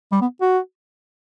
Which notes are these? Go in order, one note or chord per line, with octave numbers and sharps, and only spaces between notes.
G3
B3
F#4